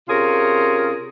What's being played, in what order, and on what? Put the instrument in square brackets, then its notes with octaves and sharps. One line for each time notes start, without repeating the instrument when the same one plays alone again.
[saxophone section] C3 C#4 F4 G#4 A#4